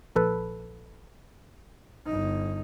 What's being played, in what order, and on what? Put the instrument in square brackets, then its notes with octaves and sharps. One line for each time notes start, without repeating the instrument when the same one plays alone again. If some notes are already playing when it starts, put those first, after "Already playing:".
[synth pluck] A#1 A4 B4
[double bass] G1 D#4